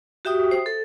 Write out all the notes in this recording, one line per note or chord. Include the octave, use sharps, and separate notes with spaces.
F#4 G4 E5 G5 D#6
C5
A4